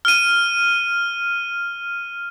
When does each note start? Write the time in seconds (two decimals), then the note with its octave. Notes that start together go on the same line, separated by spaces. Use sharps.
0.05 F6 D#7